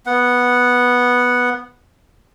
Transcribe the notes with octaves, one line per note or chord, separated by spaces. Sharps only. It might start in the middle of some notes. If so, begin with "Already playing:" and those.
B3 F#5